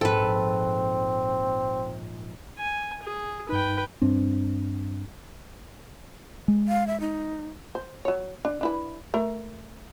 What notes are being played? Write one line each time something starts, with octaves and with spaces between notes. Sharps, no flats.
A#1 G#2 C4 A4 B4
G#5
G#4
G2 D#4 B4 G5
G2 C4 D4
G#3
F5
E5
D#4
C5
F#3 C#5
D4
D4 E4 B4
A3 A#4